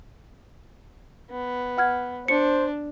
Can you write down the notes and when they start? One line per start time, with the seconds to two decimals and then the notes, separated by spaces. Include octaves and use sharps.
1.31 B3
1.78 F#5 F6 G#6
2.28 D4 C5 C#7